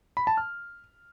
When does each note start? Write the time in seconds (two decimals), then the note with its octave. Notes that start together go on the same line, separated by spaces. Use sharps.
0.17 B5
0.27 A5
0.37 F6